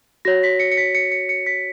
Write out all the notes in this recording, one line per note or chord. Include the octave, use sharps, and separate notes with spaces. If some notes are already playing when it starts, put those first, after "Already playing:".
F#4 C#5 A#6
B6
C#7
C#7
B6
C#7
C#7
C#7
B6